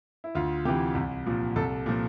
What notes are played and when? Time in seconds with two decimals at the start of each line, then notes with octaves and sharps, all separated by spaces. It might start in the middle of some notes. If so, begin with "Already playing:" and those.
0.24 E4
0.35 D2 F4
0.65 C3 E3 G4
0.95 C2
1.26 A#2 F3
1.56 C2 A4
1.86 A#2 F3